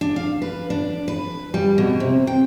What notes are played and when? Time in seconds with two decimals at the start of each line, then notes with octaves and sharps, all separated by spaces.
0.01 D4
0.16 F5
0.42 B4
0.70 D4
1.08 B4
1.54 G3
1.78 B2
2.00 C3
2.27 G5